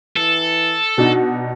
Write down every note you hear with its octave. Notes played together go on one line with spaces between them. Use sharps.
E3 A4
B2 D4 D#4 F#4